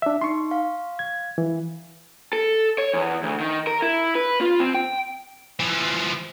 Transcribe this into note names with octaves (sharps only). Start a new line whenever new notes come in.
D4 E5
D#4 C6 C#6
F5
G#6
E3
A4
C#5
E2
D2
D#3
A#4
E4
B4
F4
C4
G5
E3 F3